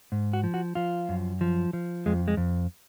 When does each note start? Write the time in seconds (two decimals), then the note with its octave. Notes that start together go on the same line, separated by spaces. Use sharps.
0.12 G#2
0.33 F#4
0.44 F3
0.54 F#4
0.75 F3 F4
1.09 F#2
1.41 F3
1.73 F3
2.06 F2 G#3
2.28 G#3
2.37 F2